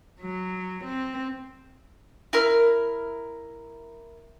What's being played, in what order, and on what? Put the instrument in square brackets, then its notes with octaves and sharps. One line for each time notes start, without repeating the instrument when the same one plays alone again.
[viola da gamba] F#3
C4
[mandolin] E4 A#4 F6